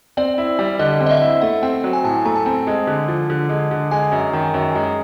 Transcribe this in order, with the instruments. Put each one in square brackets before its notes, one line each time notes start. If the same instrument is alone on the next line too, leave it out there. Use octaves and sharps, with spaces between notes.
[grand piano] C4 [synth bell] D5
[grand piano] E4
G3
[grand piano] D3 [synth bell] D#5
[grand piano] C4
[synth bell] D#5
E5
[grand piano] E4
[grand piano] A3 [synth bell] F#5
[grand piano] C4 [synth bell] G5
[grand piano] F#3
[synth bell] G#5
[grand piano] A2 [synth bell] A5
[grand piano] A3 [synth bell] A#5
[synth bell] A5
[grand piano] C4
G#3
D3
F3
D3
G#3
D3
[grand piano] G#3 [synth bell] G#5
[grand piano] F#2
D#3
F#2
G#3